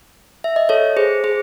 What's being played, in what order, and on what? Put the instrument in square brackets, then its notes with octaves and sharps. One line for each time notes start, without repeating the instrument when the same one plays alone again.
[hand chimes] E5
D#5
A4 C#5
G#4 C5
G#4 C5